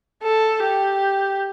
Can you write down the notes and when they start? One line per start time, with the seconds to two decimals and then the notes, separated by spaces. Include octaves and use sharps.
0.23 A4
0.63 G4